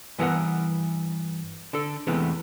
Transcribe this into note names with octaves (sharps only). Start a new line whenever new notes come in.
G2 E3 B3 F4 A#4 F#5
D3 A4
E2 C3 E3 G#3 A3 B3